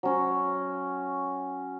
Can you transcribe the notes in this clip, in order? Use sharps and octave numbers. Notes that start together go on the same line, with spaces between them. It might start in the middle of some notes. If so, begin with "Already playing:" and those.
F#3 C#4